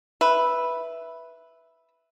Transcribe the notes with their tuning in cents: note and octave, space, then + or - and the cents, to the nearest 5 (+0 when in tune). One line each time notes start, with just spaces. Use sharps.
B4 -5 E5 +0